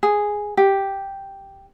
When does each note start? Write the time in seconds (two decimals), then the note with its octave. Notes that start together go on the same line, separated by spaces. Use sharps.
0.03 G#4
0.57 G4